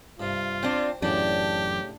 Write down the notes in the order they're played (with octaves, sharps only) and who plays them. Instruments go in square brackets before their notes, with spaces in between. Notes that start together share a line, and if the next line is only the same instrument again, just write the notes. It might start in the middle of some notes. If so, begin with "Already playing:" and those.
[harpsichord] G2 C3 [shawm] F4
[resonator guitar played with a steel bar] C4 D4 [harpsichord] C5
[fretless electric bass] F#2 E3 [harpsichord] A2 C#3 F#5 [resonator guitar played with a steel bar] D4 [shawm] G4